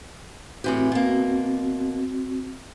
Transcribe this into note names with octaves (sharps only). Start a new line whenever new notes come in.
A2 E3 C4 F#4 G4
B2 A#3